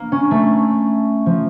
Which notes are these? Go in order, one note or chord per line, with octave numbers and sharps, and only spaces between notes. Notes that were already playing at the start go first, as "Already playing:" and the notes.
Already playing: A#3
C#4
A3
F3